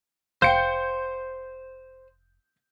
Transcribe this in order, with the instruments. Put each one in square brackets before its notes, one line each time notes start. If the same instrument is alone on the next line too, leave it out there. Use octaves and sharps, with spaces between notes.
[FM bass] F1 [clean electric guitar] C5 [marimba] F5 G5 [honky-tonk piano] G6 C#7